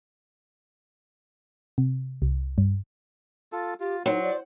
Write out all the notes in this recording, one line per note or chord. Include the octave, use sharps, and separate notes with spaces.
C3
C2
G2
F4 A4
F4 G4
F#3 D#4 C5
D5